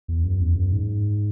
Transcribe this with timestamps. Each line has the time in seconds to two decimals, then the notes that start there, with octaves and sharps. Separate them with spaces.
0.08 E2
0.24 F#2
0.40 E2
0.56 F#2
0.72 G#2